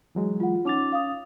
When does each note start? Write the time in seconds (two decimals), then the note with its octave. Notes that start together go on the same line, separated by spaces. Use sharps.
0.15 E3 F#3 G#3
0.40 F4 F#5
0.65 C#4 D#4 D6 A6 F7
0.92 F5 D#6